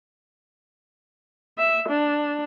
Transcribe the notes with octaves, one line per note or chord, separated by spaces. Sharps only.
E5
D4